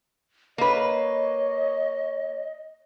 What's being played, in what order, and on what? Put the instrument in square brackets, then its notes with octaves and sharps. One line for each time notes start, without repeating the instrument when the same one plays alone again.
[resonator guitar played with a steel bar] A#3 B4 [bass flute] C#5 [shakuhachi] D#5